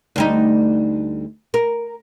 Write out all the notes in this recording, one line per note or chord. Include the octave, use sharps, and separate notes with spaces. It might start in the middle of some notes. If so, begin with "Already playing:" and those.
D2 G3 D#4
A#4